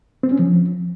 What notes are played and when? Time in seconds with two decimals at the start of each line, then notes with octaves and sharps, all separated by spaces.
0.23 C4
0.31 C#4
0.39 F3